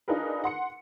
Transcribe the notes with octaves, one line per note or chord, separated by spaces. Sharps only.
D4 D#4 F4 G#4 A#4 B4
F#5 C6 C#7